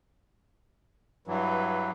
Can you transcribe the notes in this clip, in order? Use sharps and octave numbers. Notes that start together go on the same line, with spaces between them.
G2 E3 F#3 B4